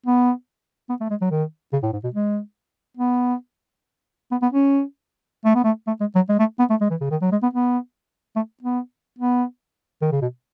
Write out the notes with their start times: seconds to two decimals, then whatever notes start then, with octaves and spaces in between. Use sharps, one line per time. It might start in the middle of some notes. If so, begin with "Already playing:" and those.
0.06 B3
0.89 B3
1.01 A3
1.10 G#3
1.21 F#3
1.31 D#3
1.73 C#3
1.83 A2
1.93 G#2
2.04 B2
2.14 G#3
2.97 B3
4.31 B3
4.42 B3
4.53 C#4
5.45 A3
5.55 B3
5.64 A3
5.87 A3
6.00 G#3
6.15 F#3
6.29 G#3
6.39 A3
6.59 B3
6.70 A3
6.81 G#3
6.90 E3
7.01 C#3
7.11 D#3
7.22 F#3
7.32 G#3
7.42 B3
7.53 B3
8.36 A3
8.63 B3
9.19 B3
10.02 D#3
10.12 C#3
10.21 B2